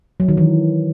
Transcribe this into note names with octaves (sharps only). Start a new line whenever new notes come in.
F#3
D#3
E3